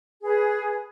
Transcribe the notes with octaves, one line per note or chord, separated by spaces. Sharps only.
G#4 B4